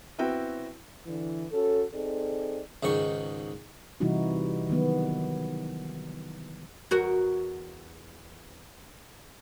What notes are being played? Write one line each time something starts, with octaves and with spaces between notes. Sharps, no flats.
B3 C4 E4 F#4 G5
D3 E3
C#4 F#4 A4
C4 D#4 G#4 A4 D5
C#2 G#2 D#3 C#6
C3 E3 G3 D#4 E4 F#4
D#3 F#3 B3
E2 F#4 A#4